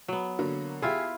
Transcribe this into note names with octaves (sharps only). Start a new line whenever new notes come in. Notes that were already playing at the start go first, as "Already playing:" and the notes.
F#3 B3
D3 A#3 F#4
E4 F4 G4 G#4 E5